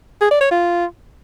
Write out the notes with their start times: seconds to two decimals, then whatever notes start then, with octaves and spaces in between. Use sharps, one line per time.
0.21 G#4
0.31 D5
0.41 C#5
0.51 F4